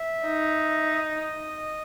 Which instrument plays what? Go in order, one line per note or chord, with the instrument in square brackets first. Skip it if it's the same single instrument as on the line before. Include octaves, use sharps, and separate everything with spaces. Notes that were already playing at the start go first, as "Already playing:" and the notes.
Already playing: [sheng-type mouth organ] E5
[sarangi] D#4
[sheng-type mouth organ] D#5